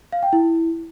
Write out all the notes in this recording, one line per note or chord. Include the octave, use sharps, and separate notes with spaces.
F5
G5
E4